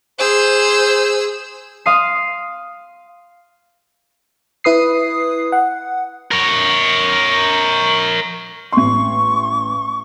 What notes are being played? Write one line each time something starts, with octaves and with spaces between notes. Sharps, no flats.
G#4 C5 E6
F5 C6 D#6 C7
E4 B4 D#6 C7
F#5
A#4 C#5
A1 C6 C#6